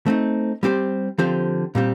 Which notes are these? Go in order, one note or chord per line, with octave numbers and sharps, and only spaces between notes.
A3 C4 D#4
G3 C4 G4 C5
D3 F3 C4 G4 C5
A#2 G3 C4 G4